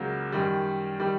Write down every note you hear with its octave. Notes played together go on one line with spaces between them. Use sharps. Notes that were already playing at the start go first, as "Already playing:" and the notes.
Already playing: C#2 C#3 F#3 A#3
F#2 D#3 G3
D#3 G3